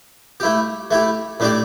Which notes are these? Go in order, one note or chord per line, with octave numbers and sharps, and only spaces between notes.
A3 E4 G4
A3 E4 G4
A2 A3 D4 G4 D5